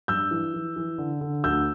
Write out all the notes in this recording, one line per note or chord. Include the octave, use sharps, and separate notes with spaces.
G2 E6 G6
E3
E3
E3
D3
D3
D2 E6 G6